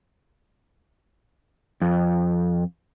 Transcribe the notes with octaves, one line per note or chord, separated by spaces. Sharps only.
F2